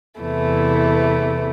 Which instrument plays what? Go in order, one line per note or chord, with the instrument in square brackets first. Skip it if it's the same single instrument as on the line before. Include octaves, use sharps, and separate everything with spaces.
[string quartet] E2 C3 E3 A3 E4